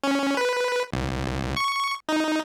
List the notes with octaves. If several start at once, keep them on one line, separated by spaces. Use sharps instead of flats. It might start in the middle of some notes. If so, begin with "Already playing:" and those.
C#4
B4
C2
C#6
D#4